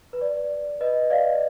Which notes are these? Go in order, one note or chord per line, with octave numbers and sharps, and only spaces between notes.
B4
D5
B4 D#5
D5 F5